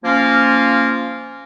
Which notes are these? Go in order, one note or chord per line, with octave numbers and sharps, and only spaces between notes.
F3 A#3 C#4 F4